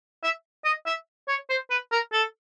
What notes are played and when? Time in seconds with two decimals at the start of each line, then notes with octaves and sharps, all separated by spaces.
0.23 E5
0.65 D#5
0.86 E5
1.28 C#5
1.50 C5
1.70 B4
1.92 A#4
2.13 A4